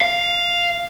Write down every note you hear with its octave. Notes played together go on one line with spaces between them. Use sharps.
F5